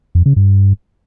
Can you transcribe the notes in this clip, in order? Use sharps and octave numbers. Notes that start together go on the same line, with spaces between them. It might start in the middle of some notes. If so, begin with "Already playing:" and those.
F2
C#3
G2